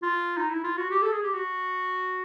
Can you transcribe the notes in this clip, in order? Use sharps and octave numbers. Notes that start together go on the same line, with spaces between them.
F4
D#4
E4
F4
F#4
G4
A4
G#4
G4
F#4